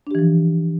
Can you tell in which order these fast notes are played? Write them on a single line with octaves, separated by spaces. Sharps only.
D4 G4 E3 F3